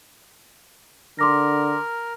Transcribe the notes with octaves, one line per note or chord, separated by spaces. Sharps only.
D3 A#4 C6 D6 A#6